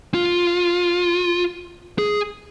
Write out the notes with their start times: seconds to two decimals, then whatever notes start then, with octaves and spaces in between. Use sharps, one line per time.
0.14 F4
1.98 G#4